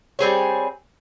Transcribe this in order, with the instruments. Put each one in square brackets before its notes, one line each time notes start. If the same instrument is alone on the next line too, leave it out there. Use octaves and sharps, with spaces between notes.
[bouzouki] G3 C4 G#4 C#5